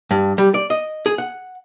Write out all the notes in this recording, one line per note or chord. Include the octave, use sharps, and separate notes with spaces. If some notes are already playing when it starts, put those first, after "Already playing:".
G2
G3
D5
D#5
G#4
F#5